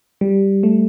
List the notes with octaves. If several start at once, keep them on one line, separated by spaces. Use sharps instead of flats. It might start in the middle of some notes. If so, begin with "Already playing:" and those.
G3
A3